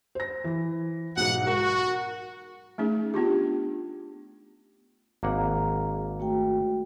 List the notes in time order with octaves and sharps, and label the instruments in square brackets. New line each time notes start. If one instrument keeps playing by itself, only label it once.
[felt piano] C5 A#6
E3
[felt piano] B1 G#2 [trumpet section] F#5
[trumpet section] F#4 [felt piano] A#4
[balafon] A3 C#4 D#4 G#4
B3 D4 F4 G4
[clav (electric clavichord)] G#1 A#3 F#5 [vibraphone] G#4 A#5
[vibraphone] A3 F#4 G5